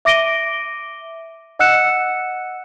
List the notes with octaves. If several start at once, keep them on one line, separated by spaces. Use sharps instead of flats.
E5 D6 A#6 D7 D#7 G7
D#5 F#5 E6 F#6 C#7 E7